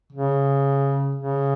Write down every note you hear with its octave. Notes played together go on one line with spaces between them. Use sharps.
C#3
C#3